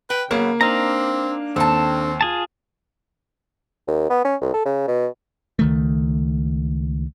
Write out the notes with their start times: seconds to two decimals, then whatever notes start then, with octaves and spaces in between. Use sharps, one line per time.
0.10 B4 G5
0.31 C#3 F#3 A#3 B3
0.61 C4 D4 D#4 F5 A#5
1.56 D#2 C4 A4 A5
2.21 F4 G#4 A5
3.87 D#2
4.10 B3
4.24 C#4
4.41 C2
4.54 A4
4.65 C#3
4.87 B2
5.59 C#2 D#3 A3